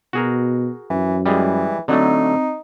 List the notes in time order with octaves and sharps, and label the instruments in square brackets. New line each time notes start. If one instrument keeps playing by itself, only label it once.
[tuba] B2 [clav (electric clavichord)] F#4 G#4 A#4
[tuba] F#2 [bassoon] E3
[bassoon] E3 [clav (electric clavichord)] G3 G#3 G#4
[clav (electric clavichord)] D3 F#3 A3 [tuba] C4 [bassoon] D#4